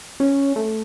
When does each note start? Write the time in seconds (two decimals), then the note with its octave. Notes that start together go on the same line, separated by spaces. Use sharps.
0.20 C#4
0.56 A3